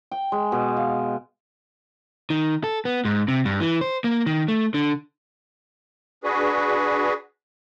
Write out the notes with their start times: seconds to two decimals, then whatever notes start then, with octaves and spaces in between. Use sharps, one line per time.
0.11 G5
0.32 G#3
0.52 B2
0.77 F5
2.30 D#3
2.64 A4
2.85 B3
3.05 G#2
3.28 C3
3.45 G2
3.60 E3
3.81 C5
4.04 A#3
4.26 D#3
4.48 A3
4.74 D3
6.24 D4 F#4 G#4 B4